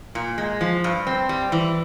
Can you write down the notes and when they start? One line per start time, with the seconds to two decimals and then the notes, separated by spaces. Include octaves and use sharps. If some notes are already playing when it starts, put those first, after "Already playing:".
0.15 A#2
0.38 G#3
0.61 F3
0.84 G2
1.07 C4
1.29 G3
1.52 E3